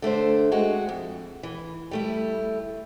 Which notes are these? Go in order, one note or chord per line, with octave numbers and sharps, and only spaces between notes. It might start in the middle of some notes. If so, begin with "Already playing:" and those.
D3 A3 D4 C5
G#3 C4 F#4
F2
E3
G3 A3 E4